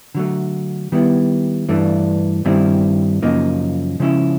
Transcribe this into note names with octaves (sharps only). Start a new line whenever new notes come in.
D3 F#3 A3
D#3 G3 B3 E4
G2 E3 A3 D4
G2 D#3 G3 C4 E4
F#2 C#3 F3 A#3 D#4
C#3 F3 G#3 C#4 E4